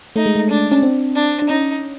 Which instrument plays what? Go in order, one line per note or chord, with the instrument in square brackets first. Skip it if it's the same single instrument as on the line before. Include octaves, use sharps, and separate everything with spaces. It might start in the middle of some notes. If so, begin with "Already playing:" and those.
[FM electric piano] A3 [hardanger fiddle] D#4
[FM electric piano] G#3
A3
[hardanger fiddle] D4
[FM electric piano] C#4
C4
[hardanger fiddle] D4
[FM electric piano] D4
[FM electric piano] C#4 [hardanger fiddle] D#4